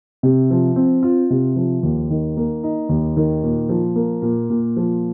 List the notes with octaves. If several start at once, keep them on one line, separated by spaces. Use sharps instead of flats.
C3
F3
C4
F4
C3
F3
D#2
D#3
A#3
D#4
D#2
D#3
A#2
F3
A#3
A#2
A#2
F3